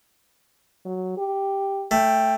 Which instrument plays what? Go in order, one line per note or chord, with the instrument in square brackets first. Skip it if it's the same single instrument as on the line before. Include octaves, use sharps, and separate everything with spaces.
[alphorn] F#3
G4
[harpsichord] A3 [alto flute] G5